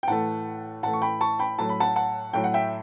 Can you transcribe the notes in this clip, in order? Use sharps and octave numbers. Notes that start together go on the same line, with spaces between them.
G5
A2 E3 A3 F#5 A5
A2 E3 A3 F#5 A5
C#6
G5 B5
A5 C#6
G5 B5
A2 F#3 A3 A5
B5
F#5 A5
F#5 A5
A2 F#3 A3 G5
F#5
E5 G5